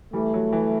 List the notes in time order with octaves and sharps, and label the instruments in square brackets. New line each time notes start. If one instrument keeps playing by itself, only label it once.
[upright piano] E3 G3 [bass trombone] A3
[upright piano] F#3
E3